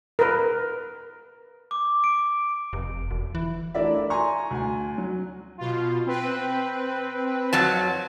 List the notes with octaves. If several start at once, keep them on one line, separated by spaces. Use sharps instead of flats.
A#4 B4
D6
D7
F1
E1
E3
A3 D4 E4 A#4 D5 E5
G#5 A#5 C6 C#6
D2 G#5
F#3
B2 F4
C4 B4
F2 F#3 A5